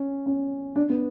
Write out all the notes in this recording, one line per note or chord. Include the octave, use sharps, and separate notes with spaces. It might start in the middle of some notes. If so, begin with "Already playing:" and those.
Already playing: C#4
C#4
D4
B3